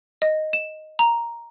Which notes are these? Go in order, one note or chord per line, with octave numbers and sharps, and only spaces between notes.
D#5
E7
A#5